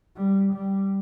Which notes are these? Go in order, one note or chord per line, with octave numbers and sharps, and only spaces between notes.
G3
G3